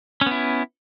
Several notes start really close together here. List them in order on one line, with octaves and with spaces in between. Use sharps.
C#4 B3 E4